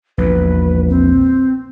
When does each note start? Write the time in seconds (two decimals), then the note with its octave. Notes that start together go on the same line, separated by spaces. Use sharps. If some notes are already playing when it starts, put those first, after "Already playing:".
0.18 A#1 E2 B4
0.89 C4